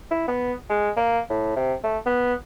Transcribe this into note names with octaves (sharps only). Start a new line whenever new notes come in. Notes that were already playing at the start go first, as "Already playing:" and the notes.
E4
B3
G#3
A#3
A2
C3
A3
B3